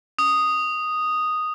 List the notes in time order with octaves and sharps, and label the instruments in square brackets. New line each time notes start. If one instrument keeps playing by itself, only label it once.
[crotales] D#6